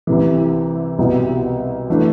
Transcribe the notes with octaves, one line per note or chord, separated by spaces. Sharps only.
C2 C3 E3
C2 B2 G3
E3 A3 D4